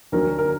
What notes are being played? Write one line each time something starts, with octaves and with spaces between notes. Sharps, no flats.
D2 D3 F#3 A#4
A#4